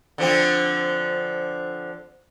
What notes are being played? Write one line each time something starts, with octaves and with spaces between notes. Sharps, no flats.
D3 F3 C4